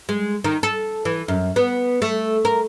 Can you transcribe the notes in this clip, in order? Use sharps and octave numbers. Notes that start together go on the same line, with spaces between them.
G#3
D#3
A4
E3
F#2
B3
A3
A#4